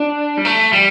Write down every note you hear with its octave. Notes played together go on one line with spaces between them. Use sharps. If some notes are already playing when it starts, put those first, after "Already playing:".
Already playing: D4
G3
A3
G3